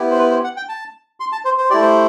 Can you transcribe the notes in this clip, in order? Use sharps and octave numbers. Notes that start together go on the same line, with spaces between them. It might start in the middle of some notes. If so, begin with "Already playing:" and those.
Already playing: B3 E4 G4
C5
B4
C5
F#5
G5
A5
C6
A5
C5
C5
A3 E4 G4 D5
C5